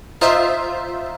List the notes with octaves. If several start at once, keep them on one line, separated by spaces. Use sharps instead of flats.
D#4 F4 C5 E5